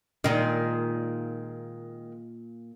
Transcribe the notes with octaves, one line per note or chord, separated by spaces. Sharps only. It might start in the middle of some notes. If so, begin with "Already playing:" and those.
A#2 D#3 G#3 D#4